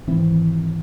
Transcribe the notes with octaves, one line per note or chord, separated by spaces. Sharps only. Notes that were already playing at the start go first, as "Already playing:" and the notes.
G#2 D#3 E3 C4 E4